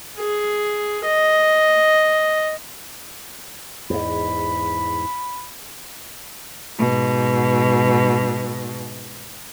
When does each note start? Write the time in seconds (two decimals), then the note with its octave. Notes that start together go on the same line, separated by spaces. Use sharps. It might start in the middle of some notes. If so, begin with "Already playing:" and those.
0.18 G#4
1.05 D#5
3.90 E2 G#2 B5
6.78 G#2 B2